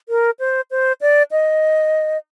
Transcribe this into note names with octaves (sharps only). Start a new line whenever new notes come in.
A#4
C5
C5
D5
D#5